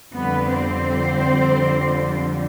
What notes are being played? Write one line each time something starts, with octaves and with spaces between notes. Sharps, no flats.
F2 D3 G3 B3 B4
C4 C5